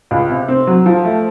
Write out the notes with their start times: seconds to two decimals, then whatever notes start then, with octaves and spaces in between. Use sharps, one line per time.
0.11 C#2
0.30 C3
0.48 C4
0.67 F#3
0.86 F3
1.04 A3